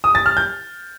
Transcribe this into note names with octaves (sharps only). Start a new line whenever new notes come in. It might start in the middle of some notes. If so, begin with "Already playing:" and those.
D#6
A6
F6
G6